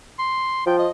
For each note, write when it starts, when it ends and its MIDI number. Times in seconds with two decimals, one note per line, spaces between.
0.19 0.65 84
0.66 0.87 53
0.66 0.76 79
0.78 0.90 75